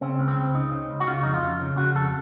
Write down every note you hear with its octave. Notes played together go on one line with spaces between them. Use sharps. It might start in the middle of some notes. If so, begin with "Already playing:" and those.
C#3 C4
C#2
C4
C#2
C#3 D#4
C#3
C#2
F#4
C#3 F4
F2 D#4
F4
F2
C#3
C#3 F#4
F2 A4